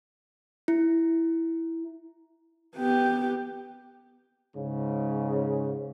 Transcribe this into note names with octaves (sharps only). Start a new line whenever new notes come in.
E4
B3 G4
G#2 C#3